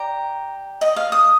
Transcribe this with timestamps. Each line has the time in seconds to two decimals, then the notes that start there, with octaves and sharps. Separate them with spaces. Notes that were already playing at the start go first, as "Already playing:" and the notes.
Already playing: G4 D5 A#5
0.81 D#5
0.96 F5
1.12 D#6